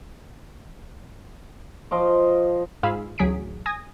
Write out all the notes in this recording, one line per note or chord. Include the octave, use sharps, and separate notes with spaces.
F3 D#5 D6
G#2 F4 G#4 F5 B5 E6
A1 D2 F#3 G#4 B6 D7
G#5 D#6 G#6 A#6